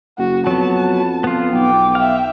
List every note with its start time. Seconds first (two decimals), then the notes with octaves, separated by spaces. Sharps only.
0.18 F#1 F#4
0.47 F2 F#3 B3 A5
1.24 B3 F4
1.53 B1 G5 D6
1.95 E5 F5 G5